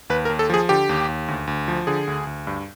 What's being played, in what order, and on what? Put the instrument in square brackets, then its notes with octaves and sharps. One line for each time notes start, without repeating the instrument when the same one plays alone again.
[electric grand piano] D#2 B4
A#4
D#2
A4
F3 G#4
D3 G4
D#2
D#2
D2
D2
F3
D3 G#4
D2
D2
G2